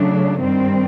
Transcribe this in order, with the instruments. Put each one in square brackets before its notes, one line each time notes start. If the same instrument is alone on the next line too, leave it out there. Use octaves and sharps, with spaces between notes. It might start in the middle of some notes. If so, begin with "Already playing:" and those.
Already playing: [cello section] C#3 F#3 A3 D4
G2 D#3 G3 C4